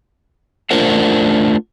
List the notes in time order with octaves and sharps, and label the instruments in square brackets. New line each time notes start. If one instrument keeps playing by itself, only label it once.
[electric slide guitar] A3 D4 F4 A#4 C5 F#5